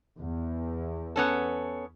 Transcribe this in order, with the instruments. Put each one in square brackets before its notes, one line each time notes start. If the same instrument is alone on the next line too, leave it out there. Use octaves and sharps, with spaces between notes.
[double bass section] E2
[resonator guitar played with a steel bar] B3 C#4 A4